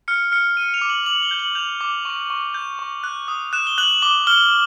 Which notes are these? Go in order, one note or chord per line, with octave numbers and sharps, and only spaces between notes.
F6 C#7
F6 C#7
F6 D#7
F7
D6
F#7
D6 F#7
G7
G6
F#7
G6 F7
D6
C#6
C#6
G6
C#6
F#6
D#6
F#6 E7
G7
F#6 F#7
D6 G7
F6 G7